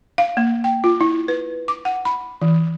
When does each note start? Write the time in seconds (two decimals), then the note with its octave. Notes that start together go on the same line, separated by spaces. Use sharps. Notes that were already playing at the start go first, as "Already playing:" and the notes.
0.18 F5
0.37 A#3
0.64 G5
0.84 F4
1.01 E4
1.28 B4
1.68 D6
1.85 F#5
2.05 B5
2.41 E3